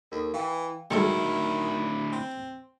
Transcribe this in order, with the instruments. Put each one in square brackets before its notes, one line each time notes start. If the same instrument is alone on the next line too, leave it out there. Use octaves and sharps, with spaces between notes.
[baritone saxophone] D#2 [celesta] A4 A#4
[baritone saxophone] E3 [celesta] F5 G5
[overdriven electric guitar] D2 E4 [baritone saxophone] D#3 [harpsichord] G3 G#3 A4 [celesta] F#4 C#7
[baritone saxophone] C4